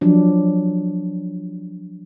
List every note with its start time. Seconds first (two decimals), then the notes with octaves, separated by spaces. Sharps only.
0.01 F3 F#3 D4